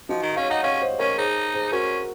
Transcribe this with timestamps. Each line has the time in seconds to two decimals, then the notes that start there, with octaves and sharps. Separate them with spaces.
0.09 F3 D#4 F#4
0.22 D#3
0.31 D#5
0.36 C#4 C#5 F5
0.50 D#4 D#5 F#5
0.63 C#4 C#5 F5
0.82 C5 D#5
0.99 C#4 A#4 C#5
1.18 D#4 G#4 C5
1.54 G#4 C5
1.72 C#4 F#4 A#4